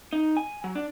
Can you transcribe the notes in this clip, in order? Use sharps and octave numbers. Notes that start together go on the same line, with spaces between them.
D#4
G#5
F#3
D4